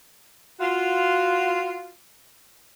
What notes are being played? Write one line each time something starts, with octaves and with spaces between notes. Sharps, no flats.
F4 F#4